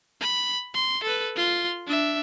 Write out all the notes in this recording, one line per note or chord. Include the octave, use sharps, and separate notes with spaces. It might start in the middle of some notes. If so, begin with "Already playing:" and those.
B5
C6
A4 B4
F4 C6
D4 E5